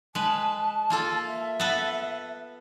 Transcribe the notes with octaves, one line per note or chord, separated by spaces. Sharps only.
G#3 B4 A5
A#3 F4 A4
E5
B3 A4 B4